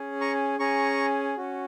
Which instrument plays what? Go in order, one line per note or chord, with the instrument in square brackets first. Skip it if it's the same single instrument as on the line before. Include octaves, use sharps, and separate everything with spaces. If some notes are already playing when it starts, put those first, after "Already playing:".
Already playing: [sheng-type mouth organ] C#4 G#4
A#5 C#6
C#4 G#4 A#5 C#6
C#4 F#4